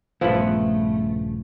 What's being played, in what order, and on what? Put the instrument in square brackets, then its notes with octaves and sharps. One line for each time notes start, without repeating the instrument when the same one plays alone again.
[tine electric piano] A#1 G2 C#3 [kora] F3 B4 [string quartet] A3 [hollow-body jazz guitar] B3 E4